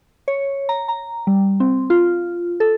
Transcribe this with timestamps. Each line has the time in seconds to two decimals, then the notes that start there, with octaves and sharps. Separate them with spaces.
0.28 C#5
0.69 A#5
0.88 A#5
1.27 G3
1.60 C4
1.90 F4
2.60 A4